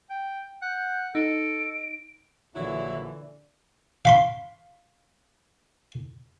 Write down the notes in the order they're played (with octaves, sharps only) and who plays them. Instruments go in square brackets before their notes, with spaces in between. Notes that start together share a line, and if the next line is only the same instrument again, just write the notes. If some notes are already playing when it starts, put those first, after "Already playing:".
[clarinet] G5
[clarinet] F#5 [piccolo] G6
[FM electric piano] D#4 [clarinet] A4 [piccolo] D7
[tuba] A#1 [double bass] D3 E3 [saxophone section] F#3 E4 [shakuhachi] D5
[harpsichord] F5 B5 C6